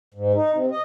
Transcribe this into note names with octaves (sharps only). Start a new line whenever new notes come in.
G#2
D#4
C3
D#5